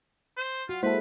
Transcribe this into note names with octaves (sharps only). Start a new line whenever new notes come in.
C5
F4 F#4
G#3 A#3 E4 A4 B4 C5